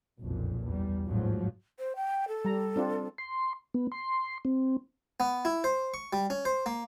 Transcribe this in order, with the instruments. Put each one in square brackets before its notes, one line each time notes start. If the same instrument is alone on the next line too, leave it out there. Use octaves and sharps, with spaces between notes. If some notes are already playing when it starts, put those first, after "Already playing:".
[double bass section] F#1 B1 F2 A#2
E2 G3
A1 G#2 F3 F#3
[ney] C5
G5
A4
[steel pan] G3 A#5
C4 D4 F4
[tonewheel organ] C6
B3
C6
C4
[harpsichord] B3
E4
C5
C#6
G3
C#4
C5
A#3